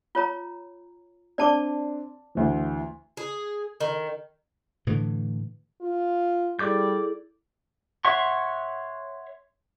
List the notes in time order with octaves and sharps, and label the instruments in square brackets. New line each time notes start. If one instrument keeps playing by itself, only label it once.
[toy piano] F4 C#5 A#5
[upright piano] C4 D4 [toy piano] D5 A5 D6
[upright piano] D2 E3
[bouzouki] G#4
D#3
[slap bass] A2 D3 E3
[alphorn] F4
[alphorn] G3 [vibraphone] E4 G#4 A4 [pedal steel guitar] D5 D6 G6
[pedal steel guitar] C#5 E5 F#5 C6 C#6